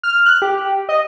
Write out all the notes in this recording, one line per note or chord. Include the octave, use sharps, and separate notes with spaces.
F6
F#6
G4
D#5